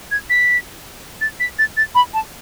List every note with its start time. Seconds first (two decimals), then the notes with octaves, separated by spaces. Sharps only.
0.11 G#6
0.30 B6
1.21 A6
1.40 B6
1.59 A6
1.77 A6
1.95 B5
2.14 A5